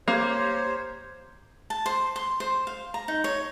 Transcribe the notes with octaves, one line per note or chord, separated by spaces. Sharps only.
A#3 G4 C5 C#5
A5
C5
C6
C5
F5
A#5
D#4
C#5